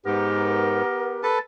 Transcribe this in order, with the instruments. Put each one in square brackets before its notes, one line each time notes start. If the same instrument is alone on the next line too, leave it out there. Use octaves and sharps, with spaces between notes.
[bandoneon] G#2 [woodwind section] B3 G4 A#4
[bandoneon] A4 B4 A5